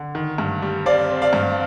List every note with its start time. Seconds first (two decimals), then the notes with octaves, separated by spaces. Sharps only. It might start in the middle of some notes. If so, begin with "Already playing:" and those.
Already playing: D3
0.15 D#3
0.38 G2
0.62 G3
0.86 C4 D5 F5
1.10 C4
1.22 D5 F5
1.33 G2